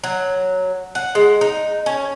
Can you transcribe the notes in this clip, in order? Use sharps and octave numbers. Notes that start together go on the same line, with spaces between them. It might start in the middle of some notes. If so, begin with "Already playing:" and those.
F#3
F#5
G#3
D#4
C#4